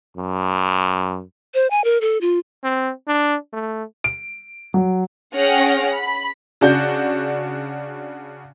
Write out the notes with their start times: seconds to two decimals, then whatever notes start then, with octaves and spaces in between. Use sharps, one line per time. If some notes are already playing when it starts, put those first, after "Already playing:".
0.17 F#2
1.54 C5
1.71 G#5
1.84 A#4
2.01 A4
2.21 F4
2.64 C4
3.08 D4
3.53 A3
4.04 D7
4.74 F#3
5.35 C#4 G#4 F#5 G5 F6 A#6
5.95 B5
6.61 C#3 D4 F#4 G6